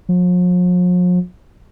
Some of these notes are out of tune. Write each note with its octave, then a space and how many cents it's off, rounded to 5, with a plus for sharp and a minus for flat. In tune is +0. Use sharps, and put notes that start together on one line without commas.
F3 +45